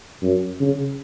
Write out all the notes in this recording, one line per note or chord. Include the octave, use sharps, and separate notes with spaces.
F#2
C#3